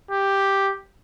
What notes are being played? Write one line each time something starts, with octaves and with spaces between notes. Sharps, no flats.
G4